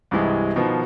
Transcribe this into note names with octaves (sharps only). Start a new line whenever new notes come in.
C2 G2 C3 E3 G#3
B2 D#3 F3 B3